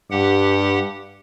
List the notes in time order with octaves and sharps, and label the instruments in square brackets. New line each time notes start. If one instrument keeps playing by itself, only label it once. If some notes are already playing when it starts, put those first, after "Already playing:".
[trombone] G2 [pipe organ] G4 F#5